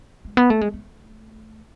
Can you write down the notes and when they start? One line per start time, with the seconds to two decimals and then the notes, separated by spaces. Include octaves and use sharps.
0.25 G#3
0.37 B3
0.50 A3
0.61 G#3
0.74 A3